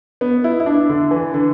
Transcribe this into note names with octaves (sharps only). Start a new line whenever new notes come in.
B3
E4
E4
D4
D3
E3
D3